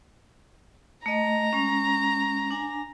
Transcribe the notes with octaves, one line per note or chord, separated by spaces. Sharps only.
A3 D#5 A#5
G#3 C#4
D4 G#5